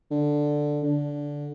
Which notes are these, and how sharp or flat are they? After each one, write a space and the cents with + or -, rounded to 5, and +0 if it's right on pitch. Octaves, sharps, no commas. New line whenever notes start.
D3 +5
D3 -10